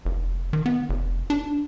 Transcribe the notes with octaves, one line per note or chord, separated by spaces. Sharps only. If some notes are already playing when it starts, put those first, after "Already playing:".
F1
D#3
B3
F1
D4